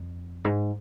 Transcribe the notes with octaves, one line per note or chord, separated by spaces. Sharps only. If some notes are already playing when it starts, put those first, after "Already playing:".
Already playing: F2
G#2